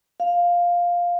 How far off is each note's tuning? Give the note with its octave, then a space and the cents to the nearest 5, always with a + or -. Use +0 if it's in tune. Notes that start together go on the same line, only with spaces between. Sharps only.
F5 +5